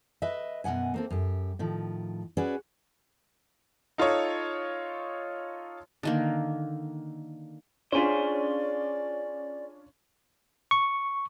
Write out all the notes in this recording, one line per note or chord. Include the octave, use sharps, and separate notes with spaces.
B4 D#5 E5
F#2 B2 B3 F#5 G#5
A#3 C4 A4
F#2 G4
A2 D#3 F3
C#4 F#4 G#4 B4 D5
D#4 F4 A4 C#5
D3 D#3 A#3
C#4 D4 F4 G#4 C5 D5
C#6